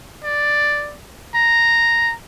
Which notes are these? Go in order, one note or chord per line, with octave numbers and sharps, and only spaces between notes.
D5
A#5